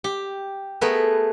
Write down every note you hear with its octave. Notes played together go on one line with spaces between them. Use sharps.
G4
A3 B3 G#4 A#4 B4